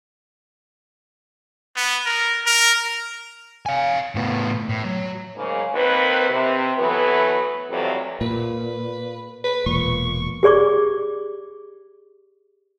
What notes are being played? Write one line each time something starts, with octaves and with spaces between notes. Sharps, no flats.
B3
A#4
A#4
F5 G#5
A2 B3
A2
F#3
G#2 C#3 A#3
D#2 D#3 A#3 C4 B4
C3
E3 F#3 A3 B3 B4
F2 A2 C3 E3 F#3 G3
A#2 B4
B4
E1 A#2 C#6
G4 G#4 D5 C#6 D6